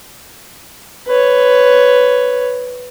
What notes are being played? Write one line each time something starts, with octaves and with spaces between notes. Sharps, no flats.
B4 C#5